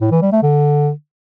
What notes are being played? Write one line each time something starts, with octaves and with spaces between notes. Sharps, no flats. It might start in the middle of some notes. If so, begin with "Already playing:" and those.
A2
E3
G3
A3
D3